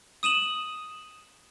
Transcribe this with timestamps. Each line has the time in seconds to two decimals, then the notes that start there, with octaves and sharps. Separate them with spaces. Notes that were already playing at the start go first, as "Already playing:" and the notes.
0.23 D#6 D#7 E7 F#7